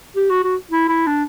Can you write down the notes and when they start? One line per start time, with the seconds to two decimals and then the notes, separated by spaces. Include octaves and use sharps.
0.16 G4
0.30 F#4
0.44 F#4
0.71 E4
0.89 E4
1.07 D4